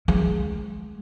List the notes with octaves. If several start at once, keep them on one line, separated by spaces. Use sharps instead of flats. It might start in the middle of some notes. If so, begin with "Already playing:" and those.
G#3